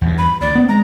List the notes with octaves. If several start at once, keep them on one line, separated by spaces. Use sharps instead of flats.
E2 G2
B5
D2 D5
B3 C4
G#3 A#5